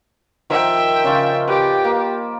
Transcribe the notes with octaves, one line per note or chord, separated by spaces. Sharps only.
D#3 F3 A#4 E5 G5
C#3 C#4 F4
G4 B4 G5 D6
A#3